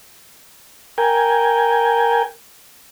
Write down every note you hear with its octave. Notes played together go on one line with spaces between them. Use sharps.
A#4 G5 G#5